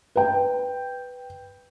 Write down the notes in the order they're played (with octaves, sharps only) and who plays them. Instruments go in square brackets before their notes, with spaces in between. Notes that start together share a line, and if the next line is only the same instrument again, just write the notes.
[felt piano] B4 G5